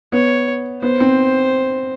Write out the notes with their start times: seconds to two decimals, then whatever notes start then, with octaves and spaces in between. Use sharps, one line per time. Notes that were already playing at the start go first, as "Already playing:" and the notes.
0.12 B3 C#5
0.82 B3 C5
1.00 C4